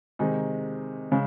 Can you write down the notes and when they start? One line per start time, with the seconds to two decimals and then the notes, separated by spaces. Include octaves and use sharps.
0.19 C3 D#3 G#3 D#4
1.11 C#3 G#3